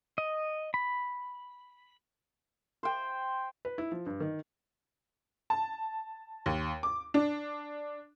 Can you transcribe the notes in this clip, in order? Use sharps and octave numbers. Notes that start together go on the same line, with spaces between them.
D#5
B5
C5 G5
B4
E4
F3
G2
D#3
A5
D#2
D6
D4